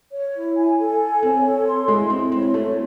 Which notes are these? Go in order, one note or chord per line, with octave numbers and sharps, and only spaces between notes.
C#5
E4
G#5
A4
G#5
C4 C#5
A4
C6
G#3 E4
C4 E4
C4 C#5
A3 E4